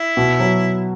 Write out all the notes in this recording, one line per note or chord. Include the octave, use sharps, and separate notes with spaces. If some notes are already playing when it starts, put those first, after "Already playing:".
Already playing: E4
B2
F#3